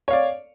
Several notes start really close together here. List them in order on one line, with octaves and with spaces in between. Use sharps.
C#5 F5 D5